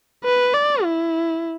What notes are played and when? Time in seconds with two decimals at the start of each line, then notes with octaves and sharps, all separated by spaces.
0.24 B4
0.54 D5
0.84 E4